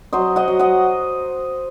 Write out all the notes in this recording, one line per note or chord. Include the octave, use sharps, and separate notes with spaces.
F#3 C5 D#5
D#5 F#5
F#3
D#5 F#5